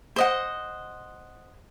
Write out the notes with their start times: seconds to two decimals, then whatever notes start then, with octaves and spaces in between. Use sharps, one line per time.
0.16 C5 D#5 F#5